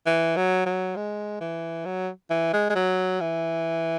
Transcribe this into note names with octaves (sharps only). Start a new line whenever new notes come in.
E3
F#3
F#3
G#3
E3
F#3
E3
G#3
G#3
F#3
E3